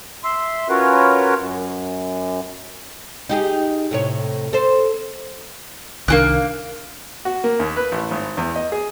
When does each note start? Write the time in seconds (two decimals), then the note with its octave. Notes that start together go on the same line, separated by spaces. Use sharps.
0.24 E5 C6
0.69 C#4 F4 F#4 A#4 B4 C#5
1.38 F#2
3.29 D#4 G4 G#4
3.91 A2 C3 C#5
4.53 A4 C5
6.08 C2 D#3 A#3 C4 D4 F#6
7.25 F#4
7.44 A#3
7.59 D#2
7.77 B4
7.92 A1
8.11 G#1
8.37 E2
8.56 D#5
8.72 G#4